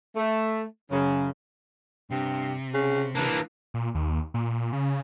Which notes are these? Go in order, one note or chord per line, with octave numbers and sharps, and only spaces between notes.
A3
F#2 C#3
G2 C3
C#3
E3 A#3 D4
A#2
D#2
A#2
C#3